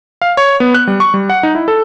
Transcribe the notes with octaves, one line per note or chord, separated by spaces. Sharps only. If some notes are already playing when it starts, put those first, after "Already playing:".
F5
C#5
B3
F#6
G3
C#6
G3
F#5
D#4
E4
A4